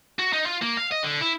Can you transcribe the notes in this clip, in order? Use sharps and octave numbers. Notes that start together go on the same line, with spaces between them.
F#4
D#4
F4
A#3
F5
D#5
D3
E4